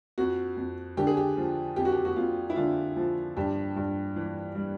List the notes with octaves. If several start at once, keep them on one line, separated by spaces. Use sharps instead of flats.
F2 F#4
F2
D3 G4
G#4
G4
F3
F2 G4
F#4
G4
F#4
F2 F4
E4
D3 F4
F3
G2 G4
G2
E3
G3